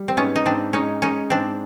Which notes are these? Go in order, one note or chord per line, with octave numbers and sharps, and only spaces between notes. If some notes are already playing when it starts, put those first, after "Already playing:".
Already playing: G3
C4
G#2 B3 C#4
D#4
G#2 C4 D4
G#3 C#4 D#4
G#3 C#4 D#4
G#2 C4 D4